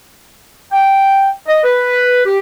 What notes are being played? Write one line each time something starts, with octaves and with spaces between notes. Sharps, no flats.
G5
D#5
B4
G4